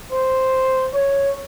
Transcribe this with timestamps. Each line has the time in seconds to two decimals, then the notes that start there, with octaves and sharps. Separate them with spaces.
0.12 C5
0.94 C#5